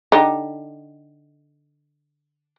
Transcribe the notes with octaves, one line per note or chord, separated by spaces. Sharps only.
D3 D#4 G4